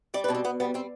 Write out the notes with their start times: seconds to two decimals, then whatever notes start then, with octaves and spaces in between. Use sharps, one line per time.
0.14 G3 D5
0.24 B4
0.28 B2 D4
0.34 C4
0.44 B2 B3
0.60 G3 B3
0.74 G3 C4